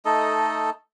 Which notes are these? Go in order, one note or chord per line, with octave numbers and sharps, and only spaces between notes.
A3 D#4 A4 D#5